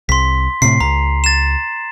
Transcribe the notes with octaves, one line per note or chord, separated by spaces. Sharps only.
C2 C6 B6
A2 C3 C7
C#2 A#5
A6 E7